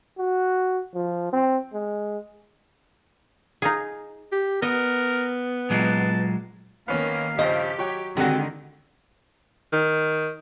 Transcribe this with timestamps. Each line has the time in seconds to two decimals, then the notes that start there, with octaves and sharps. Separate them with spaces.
0.19 F#4
0.94 F3
1.33 C4
1.73 G#3
3.62 D#4 F4 G#4
4.32 G4
4.62 B3 A#4 D#5
5.70 A#2 F#3 G#3 A5
6.88 D#3 A#3 B3 C#4 C#5 F5
7.39 G2 C#3 F3 G4 D#5
7.78 F#3 C#5 G5
8.17 D3 D#3 G#3 C4 F#4 G4 F#5
9.72 D#3